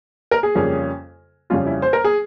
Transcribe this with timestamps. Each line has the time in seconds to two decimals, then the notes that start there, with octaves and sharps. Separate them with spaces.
0.31 A#4
0.43 G#4
0.55 F2 C#3 G3 A#3 C#4
1.50 F2 C#3 G3 C#4 F4
1.66 E4
1.82 C5
1.93 A#4
2.04 G#4